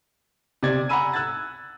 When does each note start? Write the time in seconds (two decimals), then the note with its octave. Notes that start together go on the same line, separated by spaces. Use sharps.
0.63 C3 D5 G#6
0.89 F#5 G#5 A#5 B5 E6 D#7
1.13 E6 F#6 G#6 A6